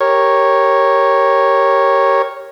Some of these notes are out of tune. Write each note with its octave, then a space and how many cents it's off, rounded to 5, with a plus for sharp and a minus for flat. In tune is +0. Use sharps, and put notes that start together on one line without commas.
G4 +5 A#4 +0 C#5 -10